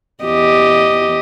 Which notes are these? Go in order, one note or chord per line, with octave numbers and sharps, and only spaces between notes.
E2 G4 D#5